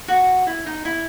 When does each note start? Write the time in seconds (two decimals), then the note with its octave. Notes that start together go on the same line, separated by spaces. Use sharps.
0.08 F#4
0.47 E4
0.66 D#4
0.85 E4